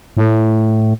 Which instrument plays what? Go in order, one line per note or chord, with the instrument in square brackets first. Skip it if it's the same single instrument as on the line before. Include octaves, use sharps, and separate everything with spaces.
[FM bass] A2